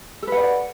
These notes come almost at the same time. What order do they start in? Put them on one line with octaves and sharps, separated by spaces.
A4 B4 F#5 D5